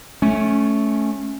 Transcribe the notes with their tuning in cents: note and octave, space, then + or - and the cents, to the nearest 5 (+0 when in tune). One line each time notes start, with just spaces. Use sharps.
A3 -15 C#4 +0